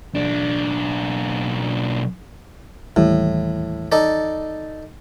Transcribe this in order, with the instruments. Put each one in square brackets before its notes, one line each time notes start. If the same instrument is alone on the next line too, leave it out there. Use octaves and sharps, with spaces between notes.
[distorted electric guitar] B1 D4
[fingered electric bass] D#2 E3 G3 [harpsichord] A2
[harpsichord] D#4 A4 D5